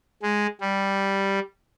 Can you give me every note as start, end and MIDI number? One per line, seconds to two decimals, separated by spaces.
0.22 0.47 56
0.61 1.39 55